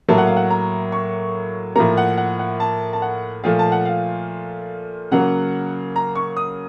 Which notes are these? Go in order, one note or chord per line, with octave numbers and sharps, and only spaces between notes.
A2 F#3 A#3 A5
F#5
F5
F#5
A#5
C#6
A2 F3 A#3 A#5
F#5
F#5
F#5
A5
A5
F#5
A#2 F3 A3 F5
A5
F#5
F5
C#3 F#3 A#3 F#5
A#5
C#6
D#6